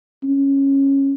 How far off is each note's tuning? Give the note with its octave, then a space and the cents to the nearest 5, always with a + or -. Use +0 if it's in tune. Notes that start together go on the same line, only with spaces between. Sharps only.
C#4 -10